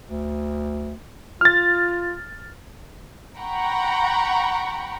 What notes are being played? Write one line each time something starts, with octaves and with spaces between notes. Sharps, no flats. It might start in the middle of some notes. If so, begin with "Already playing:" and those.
D2
F4 F6 A6
F#5 G5 A#5 B5 C#6